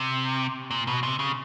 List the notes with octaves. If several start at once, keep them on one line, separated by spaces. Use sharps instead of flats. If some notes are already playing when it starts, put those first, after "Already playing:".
Already playing: C3
A#2
B2
C3
C#3